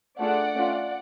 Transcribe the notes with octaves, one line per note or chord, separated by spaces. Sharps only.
A3 D4 F4 G#4 D5 F#5
A3 C#4 F4